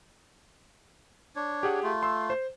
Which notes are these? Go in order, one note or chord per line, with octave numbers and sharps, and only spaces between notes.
D4 C#5
G4 G#4 F#5
A3 F4
C6 E6
C5